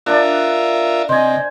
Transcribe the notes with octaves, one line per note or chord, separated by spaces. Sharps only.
D4 F4 A#4 D5 E5
C3 C5 D#5 G#5